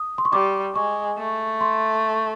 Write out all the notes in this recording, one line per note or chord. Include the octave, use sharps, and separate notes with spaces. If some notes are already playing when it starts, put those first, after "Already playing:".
Already playing: D#6
C6
C#6
G3 D6
G#3 C#6
A3
C6